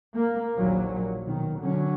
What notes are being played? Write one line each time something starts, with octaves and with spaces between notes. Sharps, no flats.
A#3
A#1 D#2 A#2 F#3
B2 D#3
D3 F#3 C#4